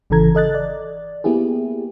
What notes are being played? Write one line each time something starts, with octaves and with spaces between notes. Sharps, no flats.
G#1 C#3 E3 A4 A#5 G#6
A4 D#5 F#6 A6
D5
A#3 B3 E4 G4 G#4